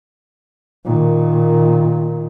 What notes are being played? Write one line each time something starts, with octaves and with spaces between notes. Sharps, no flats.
A#2 D#3